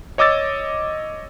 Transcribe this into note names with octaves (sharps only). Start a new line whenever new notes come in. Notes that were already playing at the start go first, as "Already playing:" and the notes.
C#5 D#5 D6 E6 A6